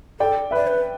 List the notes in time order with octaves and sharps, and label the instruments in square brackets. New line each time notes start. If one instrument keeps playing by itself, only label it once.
[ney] A4 [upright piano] D5 G5
[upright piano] B4 E5 [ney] D5
[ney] B4